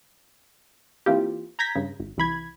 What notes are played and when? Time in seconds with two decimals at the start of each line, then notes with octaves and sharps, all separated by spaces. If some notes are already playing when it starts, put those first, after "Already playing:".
1.06 E3 A#3 C4 F4 G4
1.59 A#5 G6 G#6 A#6 B6
1.75 G2 C#3
2.00 G#1
2.17 C2 E3 B5 G#6